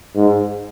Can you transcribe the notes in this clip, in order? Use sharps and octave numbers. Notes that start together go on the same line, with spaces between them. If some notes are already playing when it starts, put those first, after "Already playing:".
G#2